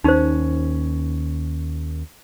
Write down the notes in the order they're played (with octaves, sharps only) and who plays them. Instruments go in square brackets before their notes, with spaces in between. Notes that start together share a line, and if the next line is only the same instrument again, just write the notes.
[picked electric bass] D#2 C#4 [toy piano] D#4 C5